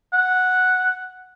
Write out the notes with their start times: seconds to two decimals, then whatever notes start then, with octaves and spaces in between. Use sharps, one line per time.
0.13 F#5